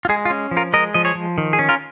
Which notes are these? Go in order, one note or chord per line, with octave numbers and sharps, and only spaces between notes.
F4
G#3 G#4
F4
C#4
F3
F4 A#4
G#3 A#4 D#5
F3 D#5
G#4 C#5
F3
D#3
G#4
C#4
F4 A#4